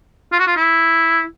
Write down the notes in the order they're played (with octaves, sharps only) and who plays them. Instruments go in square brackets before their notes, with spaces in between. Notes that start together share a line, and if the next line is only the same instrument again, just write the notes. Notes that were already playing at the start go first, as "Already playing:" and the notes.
[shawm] F4
F#4
F4
E4